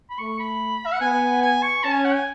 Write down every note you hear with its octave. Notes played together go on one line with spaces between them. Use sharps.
B5
A3 C#6
B5
E5
F#5
B3 G#5
G#5
C#6
C#4 A5
G#5
F#5
G#5